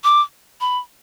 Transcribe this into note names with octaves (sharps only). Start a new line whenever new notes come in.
D6
B5